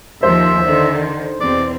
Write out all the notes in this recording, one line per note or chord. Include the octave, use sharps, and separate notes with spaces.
D#2 D#3 F3 C5 E5
D3 D#3
E2 B2 C4 D5